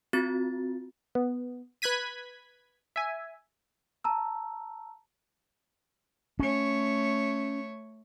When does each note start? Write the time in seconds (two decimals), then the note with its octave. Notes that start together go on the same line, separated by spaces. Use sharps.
0.13 C4 F4 F#4 A6
1.15 B3
1.82 B4 F#6 G#6 B6 D#7
2.96 E5 G#5
4.04 A5 A#5 E6
6.39 A3 C#4 C#5